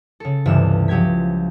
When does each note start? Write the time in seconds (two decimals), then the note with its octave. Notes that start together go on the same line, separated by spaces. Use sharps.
0.20 C#3 A4
0.46 C#2 G2 C3 E3 F6 E7
0.88 F3 F#3 G4 G#6 B6